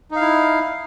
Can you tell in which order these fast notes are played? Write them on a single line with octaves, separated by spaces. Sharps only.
D#4 F5 E4